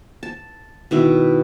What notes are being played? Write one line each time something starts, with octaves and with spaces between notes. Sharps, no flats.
A5
B2 D#3 E4